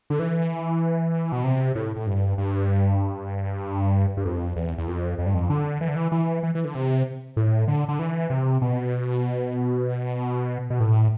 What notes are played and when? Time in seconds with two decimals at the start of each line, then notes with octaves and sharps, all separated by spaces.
0.10 D3
0.19 E3
1.32 B2
1.44 C3
1.75 A2
1.96 A2
2.07 G2
2.38 G2
4.17 G2
4.25 F2
4.56 E2
4.78 E2
4.87 F2
5.19 F2
5.26 G2
5.35 F2
5.50 D3
5.81 E3
5.88 D3
5.96 E3
6.12 E3
6.43 E3
6.55 E3
6.64 D3
6.75 C3
7.36 A2
7.68 D3
7.89 D3
7.99 E3
8.30 C3
8.62 B2
10.70 B2
10.80 A2